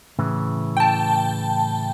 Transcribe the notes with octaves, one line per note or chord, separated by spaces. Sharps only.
A2 C#3 E3
G5 A5